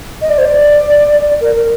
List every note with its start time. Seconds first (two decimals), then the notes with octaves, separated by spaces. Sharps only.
0.22 D#5
0.30 D5
0.38 C5
0.45 D5
1.41 A#4
1.55 A#4